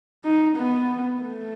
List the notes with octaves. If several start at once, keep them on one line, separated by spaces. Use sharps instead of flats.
D#4
B3
A3